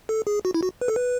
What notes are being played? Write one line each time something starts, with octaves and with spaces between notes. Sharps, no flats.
A4
G#4
F#4
E4
F#4
B4
A4
B4